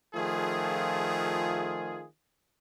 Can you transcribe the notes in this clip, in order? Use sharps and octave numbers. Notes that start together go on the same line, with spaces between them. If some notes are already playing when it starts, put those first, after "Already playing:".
D#3 F3 A3 F4 G#4